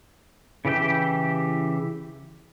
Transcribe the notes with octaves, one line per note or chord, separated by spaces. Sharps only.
C#3 E3 G4 E5 G5